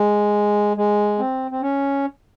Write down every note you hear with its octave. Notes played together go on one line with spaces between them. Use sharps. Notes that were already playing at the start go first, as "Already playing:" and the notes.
Already playing: G#3
G#3
C4
C4
C#4